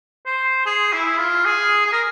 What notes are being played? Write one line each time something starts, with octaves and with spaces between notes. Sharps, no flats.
C5
G#4
E4
F4
G#4
G#4
A#4